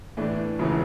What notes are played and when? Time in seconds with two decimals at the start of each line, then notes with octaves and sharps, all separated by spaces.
0.17 A2 E3 A3 D4
0.59 E1 C#3 E3 A3